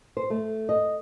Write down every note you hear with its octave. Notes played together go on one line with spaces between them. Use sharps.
C5
A3
D#5